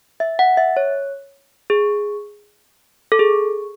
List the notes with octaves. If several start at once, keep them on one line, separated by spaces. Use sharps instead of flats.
E5
F#5
E5
C#5
G#4
A4
G#4